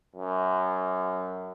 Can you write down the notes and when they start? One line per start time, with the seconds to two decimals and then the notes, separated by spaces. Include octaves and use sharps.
0.16 F#2